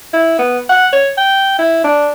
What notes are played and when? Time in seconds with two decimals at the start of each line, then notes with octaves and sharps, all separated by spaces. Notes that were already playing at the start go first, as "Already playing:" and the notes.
0.13 E4
0.38 B3
0.69 F#5
0.92 C#5
1.17 G5
1.59 E4
1.84 D4